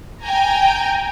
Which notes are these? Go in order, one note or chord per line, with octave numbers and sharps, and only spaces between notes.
G5 G#5 A#5